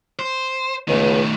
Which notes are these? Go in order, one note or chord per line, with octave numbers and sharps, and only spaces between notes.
C5
C#2 B2 D#3 A3